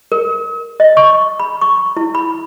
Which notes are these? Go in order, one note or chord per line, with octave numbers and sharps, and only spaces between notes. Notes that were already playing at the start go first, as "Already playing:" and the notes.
A#4
D#5
C#6
B5
C#6
E4
B5